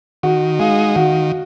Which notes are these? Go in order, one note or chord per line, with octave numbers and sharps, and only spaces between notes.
D#3 F#4 F#5
G#3 D#4 F5
D#3 F#4 F#5